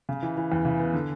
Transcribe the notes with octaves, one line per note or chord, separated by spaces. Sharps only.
C#3
E3
E3
E2
C#3
B3
D3